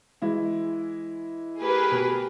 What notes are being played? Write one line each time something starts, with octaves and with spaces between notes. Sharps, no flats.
E3 G#3 E4
A3 G4 G#4 A#4 B4
B2